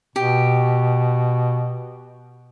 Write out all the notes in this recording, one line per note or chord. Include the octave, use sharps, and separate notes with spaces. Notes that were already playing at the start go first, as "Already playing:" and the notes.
B2 G4